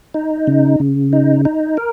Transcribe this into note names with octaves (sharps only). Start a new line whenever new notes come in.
D#4
C#3
C#3
D#4
D#4
A#4